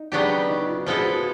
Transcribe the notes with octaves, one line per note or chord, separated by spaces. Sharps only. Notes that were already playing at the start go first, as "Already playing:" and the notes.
Already playing: D#4
C#3 F#3 B3 D4 G4
D#4
F4
F#4
F3 G#3 B3 E4 F4 A4
F#4
F4
F#4